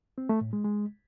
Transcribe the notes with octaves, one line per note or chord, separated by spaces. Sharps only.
C4
A3
A2
G#3
G#3